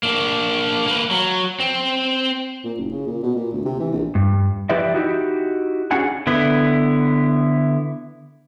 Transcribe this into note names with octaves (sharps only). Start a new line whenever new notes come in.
A#3 D4
A#3 B4
F#3
C4
A#2
F#1
C#3
A#2
B2
A#2
D2
C3
E3
A#1
G2
F3 E4 G4 B4 D5 E5
D#4 E4 F#4 G4
C#4 D4 F#4 G#4 F#5 G#5
D3 B3 E4